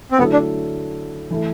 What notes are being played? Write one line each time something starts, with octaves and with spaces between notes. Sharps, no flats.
C4
D3 F#3 A3 B3 E4 A4
D4
E3 A3 E4 A4